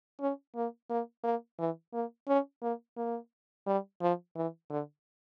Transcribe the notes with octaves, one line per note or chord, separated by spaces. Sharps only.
C#4
A#3
A#3
A#3
E3
A#3
C#4
A#3
A#3
G3
F3
E3
D3